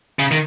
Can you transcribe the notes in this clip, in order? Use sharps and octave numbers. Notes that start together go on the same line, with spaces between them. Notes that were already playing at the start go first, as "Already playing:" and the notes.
C#3
D#3